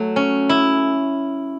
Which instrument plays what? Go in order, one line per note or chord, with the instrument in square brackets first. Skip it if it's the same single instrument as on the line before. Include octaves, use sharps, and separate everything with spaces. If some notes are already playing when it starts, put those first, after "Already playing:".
Already playing: [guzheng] F#3 [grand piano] A3
[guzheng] C#4
E4